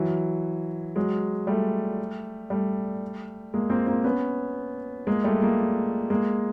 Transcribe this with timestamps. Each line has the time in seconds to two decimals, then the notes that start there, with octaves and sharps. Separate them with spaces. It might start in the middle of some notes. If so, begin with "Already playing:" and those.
Already playing: E3 F#3
0.96 F#3 G#3
1.47 G3 A3
2.50 G3 A3
3.54 G#3 A#3
3.70 A#3 C4
3.87 A#3 C4
4.04 B3 C#4
5.07 G#3 A#3
5.24 G3 A3
5.42 G#3 A#3
6.10 G#3 A#3